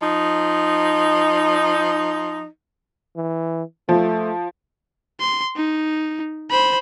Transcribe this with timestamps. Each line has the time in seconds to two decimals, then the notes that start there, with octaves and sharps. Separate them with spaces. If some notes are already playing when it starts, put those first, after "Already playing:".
0.02 F3 D#4
3.16 E3
3.89 F3 A3
5.20 C6
5.57 D#4
6.50 C5 B5